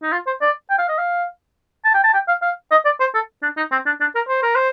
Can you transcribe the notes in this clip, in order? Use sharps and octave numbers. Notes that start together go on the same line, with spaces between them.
D#4
F4
C5
D5
G5
F5
D#5
F5
A5
G5
A5
G5
F5
F5
D#5
D5
C5
A4
D4
D#4
C4
D4
D4
A#4
C5
A#4
C5